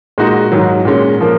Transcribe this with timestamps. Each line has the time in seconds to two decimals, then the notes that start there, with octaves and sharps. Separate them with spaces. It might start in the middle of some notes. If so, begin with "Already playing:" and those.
0.18 A#2 G#3 D#4 F#4
0.52 G#2 D#3 F#3
0.85 A#2 G#3 C#4
1.20 F3 A#3